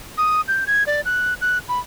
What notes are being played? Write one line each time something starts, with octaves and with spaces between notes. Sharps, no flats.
D#6
G6
G#6
D5
F#6
F#6
B5